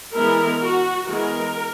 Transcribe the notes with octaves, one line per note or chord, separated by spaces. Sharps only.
E3 G#3 B3 E4 A#4
F#4
E3 G#3 B3 A#4